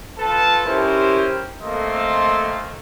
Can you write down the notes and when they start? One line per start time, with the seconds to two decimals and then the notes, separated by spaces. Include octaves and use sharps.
0.19 F4 A4 B4 A5
0.66 C#4 E4 G4 A#4 C5
1.62 A3 A#3 C4 A4 D#5 C6